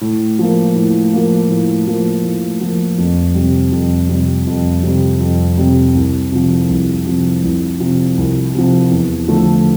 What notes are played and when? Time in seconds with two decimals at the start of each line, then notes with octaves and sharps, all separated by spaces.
0.01 A2
0.39 F3 A#3
0.76 A2
1.13 F3 A#3
1.50 A2
1.87 F3 A#3
2.24 A2
2.61 F3 A#3
2.98 F2
3.35 C3 G3
3.72 F2
4.09 C3 G3
4.47 F2
4.83 C3 G3
5.20 F2
5.57 C3 G3
5.95 C2
6.32 C3 F3
6.69 C2
7.06 C3 F3
7.43 C2
7.79 C3 F3
8.17 C2
8.54 C3 F3
8.91 E2
9.28 D3 F3 A3